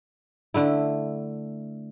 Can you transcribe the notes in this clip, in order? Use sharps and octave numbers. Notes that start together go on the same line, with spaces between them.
D3 A3 E4